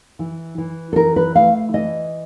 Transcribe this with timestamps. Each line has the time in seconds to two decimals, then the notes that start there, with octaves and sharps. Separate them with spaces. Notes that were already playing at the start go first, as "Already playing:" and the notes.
0.19 E3
0.58 E3
0.93 A4
0.96 E3 A#4
1.16 B4
1.35 A3 F5
1.73 E3 D#5